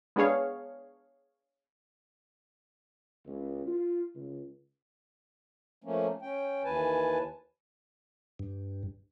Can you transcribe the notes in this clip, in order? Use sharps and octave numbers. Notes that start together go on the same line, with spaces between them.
G#3 B3 D4 G#4 C#5 F5
C#2
F4
C#2
F3 A3 A#3 C#4
C#4 G5
D#2 E3 B4 G#5 A5
G2